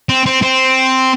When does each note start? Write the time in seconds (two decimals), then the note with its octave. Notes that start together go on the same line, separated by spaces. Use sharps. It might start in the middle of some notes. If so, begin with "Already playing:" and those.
0.09 C4
0.26 C4
0.42 C4